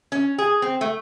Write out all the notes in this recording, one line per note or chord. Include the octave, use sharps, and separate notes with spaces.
C#4
G#4
C4
A3